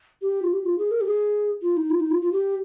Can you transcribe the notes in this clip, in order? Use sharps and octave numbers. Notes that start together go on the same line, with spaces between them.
G4
F4
G4
F4
G#4
A#4
G4
G#4
F4
D#4
F4
D#4
F4
F4
G4